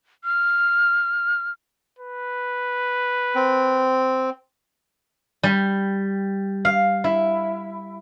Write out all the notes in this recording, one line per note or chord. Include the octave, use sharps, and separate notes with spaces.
F6
B4
C4
G3
F5
E4